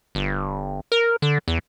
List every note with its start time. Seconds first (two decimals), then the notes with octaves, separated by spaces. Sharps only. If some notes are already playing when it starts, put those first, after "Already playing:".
0.15 G1
0.92 A#4
1.22 D3
1.48 E2